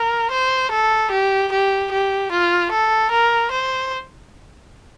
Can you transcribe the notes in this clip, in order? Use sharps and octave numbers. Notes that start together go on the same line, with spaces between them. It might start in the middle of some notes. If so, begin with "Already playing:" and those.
Already playing: A#4
C5
A4
G4
G4
G4
F4
A4
A#4
C5